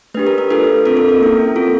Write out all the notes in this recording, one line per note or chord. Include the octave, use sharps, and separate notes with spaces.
A3 D4 G4 B4
A#4
A#4
D4 F4 A4 B4
C4 F4 A4 A#4
A4
A#4
A#3 C#4 E4
C4 F4 A4